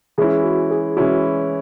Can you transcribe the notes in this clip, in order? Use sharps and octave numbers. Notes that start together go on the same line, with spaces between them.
E3 G#3 C#4 E4 G#4
F#4
G#4
E3 G#3 C#4 E4 F#4